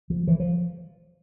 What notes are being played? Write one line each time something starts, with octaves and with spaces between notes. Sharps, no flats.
F3
E3
F3